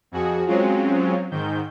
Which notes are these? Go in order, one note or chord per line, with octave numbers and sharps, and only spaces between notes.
F2 F#4 G#4
F#3 G#3 C4 C#4 F4
G#2 D#3 G6